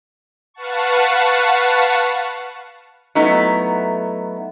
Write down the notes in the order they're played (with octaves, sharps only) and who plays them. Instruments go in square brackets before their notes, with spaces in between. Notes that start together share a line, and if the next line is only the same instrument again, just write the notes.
[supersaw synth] B4 F5 F#5 A5 C#6
[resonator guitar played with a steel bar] F#3 A3 B3 D#4 E4